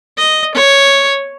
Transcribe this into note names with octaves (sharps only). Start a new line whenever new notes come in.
D#5
C#5